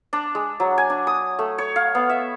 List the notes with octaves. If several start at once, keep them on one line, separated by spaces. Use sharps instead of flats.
D4
G#3
F#3
G#5
D4
D#6
A3
C#5
F5
B3
E5